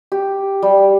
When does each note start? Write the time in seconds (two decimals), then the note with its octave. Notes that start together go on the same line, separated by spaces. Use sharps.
0.12 G4
0.62 G3